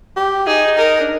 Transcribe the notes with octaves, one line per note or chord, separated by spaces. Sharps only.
G4
D#4 G#4
A#4
D4